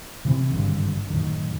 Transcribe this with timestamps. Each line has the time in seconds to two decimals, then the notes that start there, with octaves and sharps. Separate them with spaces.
0.25 C3 E3 A#3 C4
0.51 G#1 G2 D3
1.10 D1 F#2 D#3